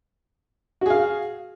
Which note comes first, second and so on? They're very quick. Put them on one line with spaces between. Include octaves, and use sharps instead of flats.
F#4 G#4 F5